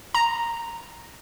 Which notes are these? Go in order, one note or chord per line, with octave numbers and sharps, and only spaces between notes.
A#5